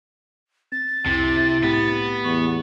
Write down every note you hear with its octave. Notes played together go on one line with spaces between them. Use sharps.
C4 A6
C2 F2 C3 E4
A2 A3 B3 G4
E2 C#6